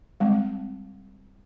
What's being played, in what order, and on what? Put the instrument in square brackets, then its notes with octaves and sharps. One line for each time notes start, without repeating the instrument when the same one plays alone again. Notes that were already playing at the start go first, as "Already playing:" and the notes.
[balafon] G3 G#3 C4